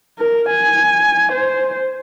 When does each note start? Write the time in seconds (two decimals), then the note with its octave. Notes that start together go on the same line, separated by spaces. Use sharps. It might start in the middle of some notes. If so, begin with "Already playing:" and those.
0.19 A#4
0.50 G#5
1.32 C5